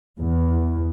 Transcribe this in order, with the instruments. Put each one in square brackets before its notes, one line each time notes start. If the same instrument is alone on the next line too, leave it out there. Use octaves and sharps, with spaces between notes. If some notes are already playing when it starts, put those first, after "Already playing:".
[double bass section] E2